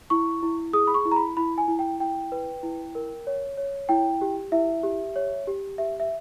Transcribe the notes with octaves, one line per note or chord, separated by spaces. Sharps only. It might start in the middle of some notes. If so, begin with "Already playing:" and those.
E4 C#6
E4
G#4 D#6
B5
C#6
E4
A#5
B5
E4 B5
G#5
E4
G5
E4 G5
B4
E4
A#4
C#5
C#5
E4 G5
G4
E4 E5
G4
C#5
G4
G4 E5
E5